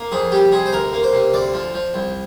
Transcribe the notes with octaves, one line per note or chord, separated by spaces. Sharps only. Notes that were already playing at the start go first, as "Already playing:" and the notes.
Already playing: A#3
F2 G#4
G3 G4
C3 G#4
C5
D2 A#4
A#3
C5
C3
D2 D5
F3
F3
C2